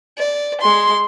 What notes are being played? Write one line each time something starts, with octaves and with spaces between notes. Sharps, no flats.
D5
G#3 C6